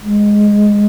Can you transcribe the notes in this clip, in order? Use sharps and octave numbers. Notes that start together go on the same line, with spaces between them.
G#3